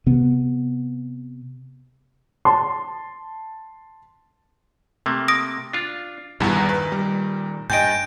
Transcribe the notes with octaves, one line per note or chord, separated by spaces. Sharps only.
C3 B3
A5 C6
C3 A3 A#3
D#6 A#6 D7
D4 F4
E2 G2 A#2 D#3
B4
G3
G2 D#5 G5 G#5 G6 D7